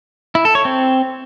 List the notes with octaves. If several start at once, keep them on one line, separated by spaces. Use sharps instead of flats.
E4
A4
C#5
C4